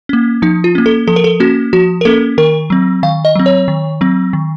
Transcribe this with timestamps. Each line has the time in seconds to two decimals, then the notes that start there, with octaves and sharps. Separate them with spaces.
0.09 A#3 C#4
0.42 F3 D#4
0.64 F4
0.75 A#3 C#4
0.86 A4
1.07 F3 A4
1.16 A#4
1.24 A4
1.40 A#3 C#4 F#4
1.73 F3 F#4
2.01 A#4
2.05 A#3 C#4 A4
2.38 D#3 A#4
2.70 F#3 C4
3.03 D#3 F5
3.25 D#5
3.36 F#3 C4
3.46 C#5
3.68 D#3
4.01 F#3 C4
4.33 D#3